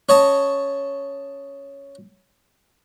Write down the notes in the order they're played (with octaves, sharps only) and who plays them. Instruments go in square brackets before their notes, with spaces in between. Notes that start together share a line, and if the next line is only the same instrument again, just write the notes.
[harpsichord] C#4 C#5 D#5 A5